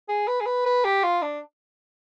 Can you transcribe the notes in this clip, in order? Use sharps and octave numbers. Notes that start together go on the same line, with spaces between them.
G#4
B4
G#4
B4
B4
G4
F4
D4